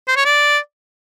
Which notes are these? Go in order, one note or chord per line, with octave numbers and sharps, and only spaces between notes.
C5
C#5
D5